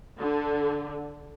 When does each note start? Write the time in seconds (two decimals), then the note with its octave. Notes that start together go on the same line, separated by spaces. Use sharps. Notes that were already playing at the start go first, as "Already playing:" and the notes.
0.19 D3